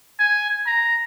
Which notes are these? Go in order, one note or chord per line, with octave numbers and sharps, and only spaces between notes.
G#5
A#5